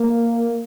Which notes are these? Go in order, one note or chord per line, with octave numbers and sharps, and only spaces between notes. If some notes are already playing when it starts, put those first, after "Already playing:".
Already playing: A#3